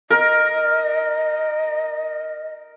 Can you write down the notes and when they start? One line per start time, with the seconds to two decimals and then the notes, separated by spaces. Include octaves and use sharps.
0.10 A#4 D#5